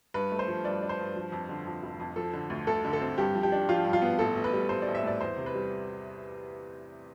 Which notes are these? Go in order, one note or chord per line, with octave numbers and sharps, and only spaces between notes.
G2 B4
A3
C5
F3
G2 D5
D4
C5
G2
F3
F2
D3
F2
F1
F2
F3 A4
D3
D2
D2 A4
D3
A4
C4
G2 G4
F3
G4
D4
F3 F4
G2
F4
B3
A1 A4
A1
B4
G3
A1 C5
A1 D5
E5
A2 D5
E2 C5
C3
B4
G3